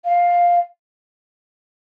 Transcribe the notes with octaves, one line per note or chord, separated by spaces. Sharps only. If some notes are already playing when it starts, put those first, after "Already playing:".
F5